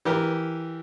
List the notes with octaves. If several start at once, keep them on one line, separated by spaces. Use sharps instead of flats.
E3 G4 A#4